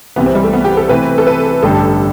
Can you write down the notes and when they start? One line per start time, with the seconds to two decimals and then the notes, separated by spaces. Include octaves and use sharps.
0.16 C2 C3 E3 B3
0.26 C4
0.35 G3
0.44 A3
0.53 B3
0.65 G4
0.77 A4
0.89 C3 E3 A3 C4 B4
1.18 A4
1.27 B4
1.62 A1 G2 D3 G3 A4